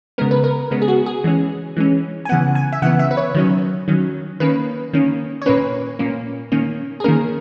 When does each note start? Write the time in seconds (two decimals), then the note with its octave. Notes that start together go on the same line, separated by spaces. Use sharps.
0.18 C#3 G#3 B3 A#4
0.31 B4
0.44 A#4
0.71 C#3 G#3 B3
0.82 G#4
0.88 F#4
1.06 G#4
1.24 E3 G#3 C#4
1.77 E3 G#3 C#4
2.25 G#5
2.29 C#3 E3 B3 F#5
2.55 G#5
2.73 E5
2.82 C#3 E3 B3 F#5
2.99 E5
3.11 B4
3.17 C#5
3.35 D#3 F#3 C#4
3.88 D#3 F#3 C#4
4.40 D#3 A#3 C#4 B4
4.93 D#3 A#3 C#4
5.42 C#5
5.46 A#2 A#3 C#4 B4
5.99 A#2 A#3 C#4
6.52 D#3 A#3 C#4
7.00 G#4
7.04 D#3 A#3 C#4 A#4